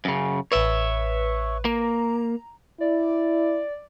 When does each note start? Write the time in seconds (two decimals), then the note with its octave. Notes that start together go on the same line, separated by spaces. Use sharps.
0.05 F#2 C#3
0.52 A1 B4 C#5 E5
1.65 A#3 A#5
2.80 E4 D5